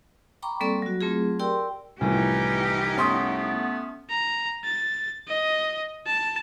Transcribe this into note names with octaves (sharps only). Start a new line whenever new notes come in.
G5 A#5 B5 C#6 D6
G3 A#3 C4 A4 D5 C#6
F#3 F#4
F#3 A3 C4 F4 G#4
G4 A#4 D5 G5 C6 E6
C2 A2 E3 F3 C#4 D#4 G4
A3 B3 C#4 C6 D#6
A#5
A6
D#5
A5